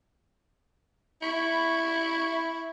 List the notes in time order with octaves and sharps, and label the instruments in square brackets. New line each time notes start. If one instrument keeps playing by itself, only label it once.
[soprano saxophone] E4 [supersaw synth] B5 C#6